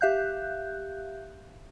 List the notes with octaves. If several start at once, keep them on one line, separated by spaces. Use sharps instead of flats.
G4 E5 F5 F#6 G6